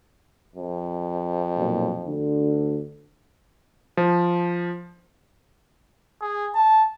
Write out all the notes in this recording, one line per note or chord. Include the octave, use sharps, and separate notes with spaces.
F2
B1 A#2 F#3
D2 D3
F3
G#4
A5